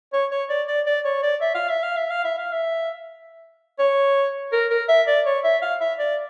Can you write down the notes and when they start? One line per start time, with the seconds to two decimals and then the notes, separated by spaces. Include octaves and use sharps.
0.13 C#5
0.31 C#5
0.49 D5
0.68 D5
0.86 D5
1.05 C#5
1.23 D5
1.41 E5
1.55 F5
1.69 E5
1.83 F5
1.97 E5
2.10 F5
2.24 E5
2.38 F5
2.52 E5
3.79 C#5
4.52 A#4
4.71 A#4
4.89 E5
5.07 D5
5.26 C#5
5.44 E5
5.62 F5
5.81 E5
5.99 D5